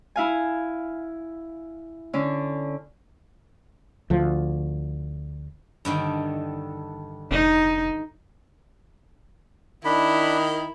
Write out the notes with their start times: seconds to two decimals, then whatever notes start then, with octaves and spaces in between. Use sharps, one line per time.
0.16 E4 F5 G#5
2.13 D3 C#4
4.10 D2 F3
5.85 G2 D3 D#3
7.31 F1 D#4
9.85 D#3 D4 E4 B5